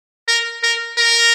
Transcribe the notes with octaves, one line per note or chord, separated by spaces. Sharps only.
A#4
A#4
A#4